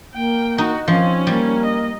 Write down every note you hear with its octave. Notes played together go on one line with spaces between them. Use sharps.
A#3 G5
D#4 F#4
F3 C4 C#4
G3 A#3
D#5